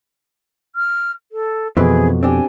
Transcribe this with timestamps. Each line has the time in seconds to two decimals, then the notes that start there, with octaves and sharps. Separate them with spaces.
0.75 F6
1.32 A4
1.77 F2 B2 E3 C4 G#4 B4
2.23 C4 D4 G4 G#5